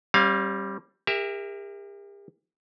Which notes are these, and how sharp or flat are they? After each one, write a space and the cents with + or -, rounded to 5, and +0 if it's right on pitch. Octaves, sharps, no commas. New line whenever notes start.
G3 +0 C#4 -45 F5 +15
G4 +45 A#4 +0 E5 +0